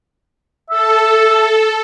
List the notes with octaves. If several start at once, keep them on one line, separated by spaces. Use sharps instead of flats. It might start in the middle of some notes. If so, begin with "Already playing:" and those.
A4 E5